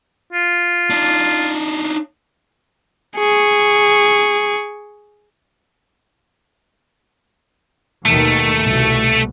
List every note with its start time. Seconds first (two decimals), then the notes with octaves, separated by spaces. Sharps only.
0.32 F4
0.90 D4 D#4
3.17 G#4 C#6
8.05 D#2 B2 D#3 A3
8.61 C2 B2